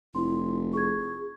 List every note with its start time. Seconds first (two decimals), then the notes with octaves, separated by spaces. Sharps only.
0.15 F1 E4 C6
0.73 G#4 C#6 G#6